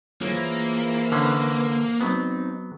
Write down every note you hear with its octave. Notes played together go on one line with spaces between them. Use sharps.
E3 A#3 F4 G#4 C5 C#5
D3 C#4 B4
F#3 B3 C4 D#4